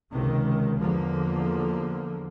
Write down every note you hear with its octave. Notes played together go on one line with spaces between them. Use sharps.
C#2 C3 D#3
E2 D3 F3 A#3